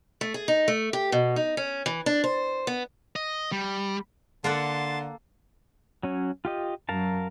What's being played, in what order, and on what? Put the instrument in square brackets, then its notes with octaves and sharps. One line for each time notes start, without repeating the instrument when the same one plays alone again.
[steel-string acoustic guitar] A3
G#4
D#4
A3
G4
B2
D#4
C#4
E3
D4
C5
B3
[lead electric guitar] D#5
G3
[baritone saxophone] D3 [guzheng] A#3 A4 F#5 [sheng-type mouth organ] A5 C6
[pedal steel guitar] F#3 C#4
F4 G4 D#5
[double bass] F#2 F#3 [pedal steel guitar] A#4 F5 A5